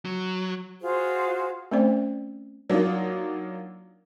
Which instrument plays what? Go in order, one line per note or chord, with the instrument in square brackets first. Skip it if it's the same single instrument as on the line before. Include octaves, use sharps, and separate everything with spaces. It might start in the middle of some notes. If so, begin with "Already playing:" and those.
[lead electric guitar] F#3
[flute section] F4 F#4 G#4 C5
[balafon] A3 C4 C#4 C5 D5
[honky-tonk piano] F#3 A#3 D4 D#4 F4